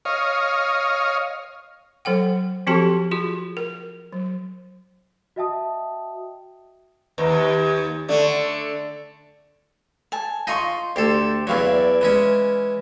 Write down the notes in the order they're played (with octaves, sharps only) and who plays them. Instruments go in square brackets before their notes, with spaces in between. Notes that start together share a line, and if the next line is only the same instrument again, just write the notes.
[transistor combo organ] C#5 D#5 F5
[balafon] F#3 A4 F#5 G5
F3 C4 F#4 G4 A4 A5
F4 F#4 G#4
A#4
F#3
[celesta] F#4 D#5 E5 G5 A5 D#6
[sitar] D#2 [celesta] B4 A#5
[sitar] D3 A3 [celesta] D5
[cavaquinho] G#5 A5
[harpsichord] D#4 D#5 [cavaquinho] F4 C6 C#6
[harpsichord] D2 A4 [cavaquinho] G4 C6
[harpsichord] E2 E3 F#3 [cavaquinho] D5 F5 C#6
[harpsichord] E3 G#3 C#4